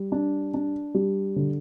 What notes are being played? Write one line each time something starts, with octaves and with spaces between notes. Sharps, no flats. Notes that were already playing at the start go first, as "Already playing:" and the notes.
Already playing: G3
D4
D4
G3
D3